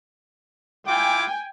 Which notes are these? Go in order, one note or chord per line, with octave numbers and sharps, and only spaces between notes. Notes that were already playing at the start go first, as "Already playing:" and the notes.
E4 F4 G5 G#5 D6